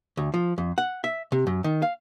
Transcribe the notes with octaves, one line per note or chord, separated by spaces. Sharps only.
D2
F3
F2
F#5
E5
C3
F#2
D#3
F5